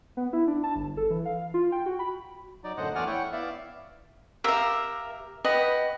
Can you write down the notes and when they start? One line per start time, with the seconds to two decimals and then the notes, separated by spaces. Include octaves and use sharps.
0.17 B3
0.33 E4
0.47 D4
0.64 A5
0.76 G1
0.97 A4
1.10 E3
1.25 F5
1.54 F4
1.72 G5
1.86 F#4
1.99 B5
2.64 F#3 D#4 D5
2.77 F#2 A2 D3 C5 D#5 F#5
2.95 E2 A3 D5 F#5 G#5 F6
3.07 E4 C#5 F#5 G5 C#6
3.32 B3 E4 D5 E5 F5
4.44 G4 A#4 E5 F5 E6
5.45 F#4 G4 B4 D#5